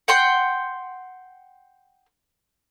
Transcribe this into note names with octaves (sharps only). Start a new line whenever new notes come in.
F#5 G5 C6